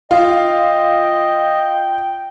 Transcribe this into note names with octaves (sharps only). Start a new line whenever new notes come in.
F4 D#5 G5